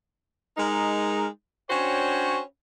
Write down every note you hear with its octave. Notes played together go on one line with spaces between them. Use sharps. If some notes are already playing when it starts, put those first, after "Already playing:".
G#3 D#4 A#4
C#4 D4 F#4 C5 C#5 G5